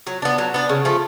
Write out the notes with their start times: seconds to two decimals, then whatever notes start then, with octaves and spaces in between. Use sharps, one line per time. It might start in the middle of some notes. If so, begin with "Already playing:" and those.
0.07 F#3
0.22 B3 D4
0.38 F#3
0.54 B3 D4
0.69 C#3
0.85 F3 A3